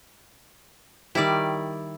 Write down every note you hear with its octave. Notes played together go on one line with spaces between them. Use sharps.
D#3 G3 E4 D5